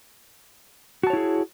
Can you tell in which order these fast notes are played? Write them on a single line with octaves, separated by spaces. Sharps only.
F#4 A5 C#5 E4 G#4